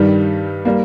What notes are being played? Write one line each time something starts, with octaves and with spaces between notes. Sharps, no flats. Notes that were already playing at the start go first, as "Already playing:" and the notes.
Already playing: G2 D#3 G3
G3 A#3